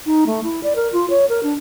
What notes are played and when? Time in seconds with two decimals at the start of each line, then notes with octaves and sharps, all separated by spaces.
0.06 D#4
0.27 A3
0.44 E4
0.63 D5
0.76 A#4
0.92 F4
1.10 C#5
1.29 A#4
1.43 D4